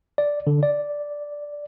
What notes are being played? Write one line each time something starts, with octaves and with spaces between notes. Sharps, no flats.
D5
D3
D5